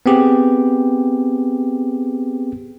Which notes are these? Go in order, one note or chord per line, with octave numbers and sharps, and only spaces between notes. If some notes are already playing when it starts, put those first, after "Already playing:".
B3 C4 G4 G#4